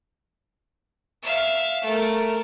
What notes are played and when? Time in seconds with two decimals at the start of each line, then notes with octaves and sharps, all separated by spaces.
1.23 E5 F5
1.82 A3 A#4